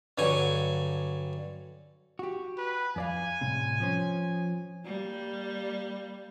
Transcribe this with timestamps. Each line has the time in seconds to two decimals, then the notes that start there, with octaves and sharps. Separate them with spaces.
0.18 G2 D3 F#3 G#5 C#6
2.19 F#4 G4
2.58 B4
2.96 F2 D5 F5 G#5
3.41 C2 A2 C3
3.80 F3 C#4 C5
4.85 G3 A#3